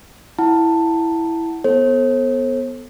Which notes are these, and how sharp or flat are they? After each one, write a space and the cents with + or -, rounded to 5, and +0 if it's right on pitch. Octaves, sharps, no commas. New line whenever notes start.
E4 +0 F#5 +0 A5 +10
B3 +0 A4 +0 C5 +40